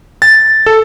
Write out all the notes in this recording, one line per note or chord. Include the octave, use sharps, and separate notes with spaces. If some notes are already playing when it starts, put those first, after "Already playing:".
A6
A4